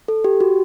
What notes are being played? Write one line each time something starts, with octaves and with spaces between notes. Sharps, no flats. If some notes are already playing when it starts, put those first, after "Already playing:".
A4
G4
F#4